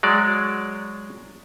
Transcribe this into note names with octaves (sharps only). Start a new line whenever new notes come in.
F#3 G#3 D5